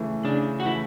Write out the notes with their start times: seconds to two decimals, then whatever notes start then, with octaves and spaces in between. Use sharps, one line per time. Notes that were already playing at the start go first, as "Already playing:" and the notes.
Already playing: C#3 E3 A3
0.24 C#3 D4
0.60 F#4
0.65 E3 A3 E4